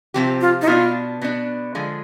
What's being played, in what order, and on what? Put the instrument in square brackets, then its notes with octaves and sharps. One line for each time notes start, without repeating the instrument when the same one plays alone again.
[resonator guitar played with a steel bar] C3 F3 C4 G4
[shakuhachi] F4
D#4
[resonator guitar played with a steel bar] B2 B3 D4 [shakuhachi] F4
[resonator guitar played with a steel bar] B2 B3 D4
D3 F3 G#3